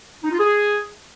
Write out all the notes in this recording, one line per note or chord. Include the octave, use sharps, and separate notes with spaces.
D#4
F4
G#4